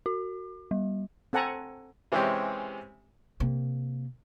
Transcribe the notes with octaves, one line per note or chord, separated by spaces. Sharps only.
F#4
G3
C4 A4 F#5 G#5 A#5
C3 E3 G#3 C4 C#4 G4
C3 A#3